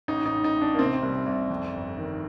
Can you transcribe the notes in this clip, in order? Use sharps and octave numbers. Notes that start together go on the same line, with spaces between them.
A1 D#4
D#4
A1
D#4
A1
D4
A#3
C3 C4
C2
C2
F2
G1
D#3